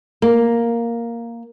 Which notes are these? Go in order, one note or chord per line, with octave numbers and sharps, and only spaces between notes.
A#3